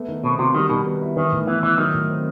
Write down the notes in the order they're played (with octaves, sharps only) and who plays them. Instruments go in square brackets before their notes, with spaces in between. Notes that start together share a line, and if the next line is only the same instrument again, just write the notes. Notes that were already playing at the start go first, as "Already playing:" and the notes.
Already playing: [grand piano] A3 B3
D#3
[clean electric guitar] B2 [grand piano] C4
[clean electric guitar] C3 [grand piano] F#4
[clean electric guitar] D#3 [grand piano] G3
[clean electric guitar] B2 [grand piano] D#3
[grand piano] B3
E4
[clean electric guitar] D#3 [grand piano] E3
[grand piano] A2
[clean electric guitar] E3 [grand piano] B3
[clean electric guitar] E3 [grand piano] E4
[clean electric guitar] D#3 [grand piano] F#3
[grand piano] A2
C4